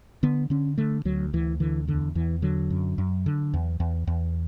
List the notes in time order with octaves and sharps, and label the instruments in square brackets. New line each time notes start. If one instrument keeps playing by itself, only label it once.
[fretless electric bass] D3 B3
D3 C#4
D3 A3
D2 F#3
D2 E3
D3 E3
E2 D3
E2 E3
D3 F#3
F#2
F#2
D3
E2
E2
E2